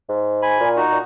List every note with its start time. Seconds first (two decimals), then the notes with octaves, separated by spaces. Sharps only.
0.09 G#2
0.42 G#5 B5
0.60 A#2
0.76 D#4 F#4
0.91 A#2